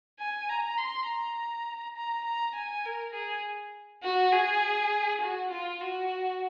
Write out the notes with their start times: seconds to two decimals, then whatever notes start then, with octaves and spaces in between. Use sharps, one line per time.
0.19 G#5
0.49 A#5
0.78 C6
1.07 A#5
1.96 A#5
2.25 A#5
2.55 G#5
2.85 A#4
3.14 G#4
4.03 F#4
4.32 G#4
5.21 F#4
5.51 F4
5.81 F#4